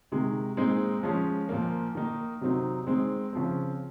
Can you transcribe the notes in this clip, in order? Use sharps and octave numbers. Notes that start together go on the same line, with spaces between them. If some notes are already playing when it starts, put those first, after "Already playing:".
C3 D#3 G#3
A#2 G#3 C4 D#4
F3 G#3 C#4
A#2 F3 A#3
D#3 A#3 D#4
C3 F#3 C4 D#4
D#3 G#3 C4
C#3 F3 C4